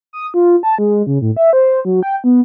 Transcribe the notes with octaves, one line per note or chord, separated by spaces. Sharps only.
D#6
F4
A5
G#3
C#3
A2
E5
C5
F#3
G5
B3